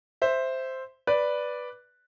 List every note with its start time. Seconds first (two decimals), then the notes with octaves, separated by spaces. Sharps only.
0.22 C5 E5
1.07 B4 D5